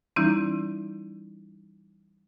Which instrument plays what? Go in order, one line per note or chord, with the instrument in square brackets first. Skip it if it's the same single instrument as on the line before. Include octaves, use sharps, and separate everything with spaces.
[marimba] E3 G3 C#4 D#4 E4